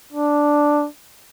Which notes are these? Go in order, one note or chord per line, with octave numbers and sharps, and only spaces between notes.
D4